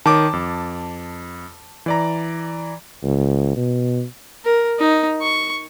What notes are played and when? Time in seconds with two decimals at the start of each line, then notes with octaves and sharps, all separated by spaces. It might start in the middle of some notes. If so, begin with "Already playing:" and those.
0.06 D#3 C#5 A5 D6
0.33 F2
1.86 E3 D5 A#5
3.03 C#2
3.56 B2
4.45 A#4
4.79 D#4
5.22 C#6